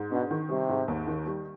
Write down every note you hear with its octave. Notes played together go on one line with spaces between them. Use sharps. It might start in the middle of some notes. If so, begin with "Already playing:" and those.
Already playing: G#2
B2 D4
D#3
C3 G3
G#2
D#2
D#3
G3